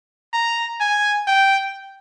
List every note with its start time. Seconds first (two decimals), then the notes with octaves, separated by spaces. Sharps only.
0.33 A#5
0.80 G#5
1.27 G5